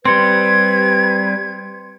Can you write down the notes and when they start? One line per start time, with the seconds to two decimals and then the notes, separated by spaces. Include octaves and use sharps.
0.05 G3 C4 B4 C6 G#6 C#7